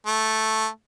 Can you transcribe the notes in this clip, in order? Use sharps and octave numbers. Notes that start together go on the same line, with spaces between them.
A3